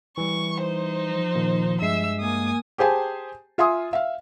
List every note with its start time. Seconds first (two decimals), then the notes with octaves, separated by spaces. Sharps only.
0.18 E3 G3 C#6
0.61 D#4 C5
1.04 F3
1.35 A#2 D#3
1.81 G2 G#3 E5 E6 C7
2.20 A#3 G#5 D#6
2.78 G4 G#4 C5 G#5 A5
3.58 F4 E5 G#5 C6 D#6
3.93 E5 F5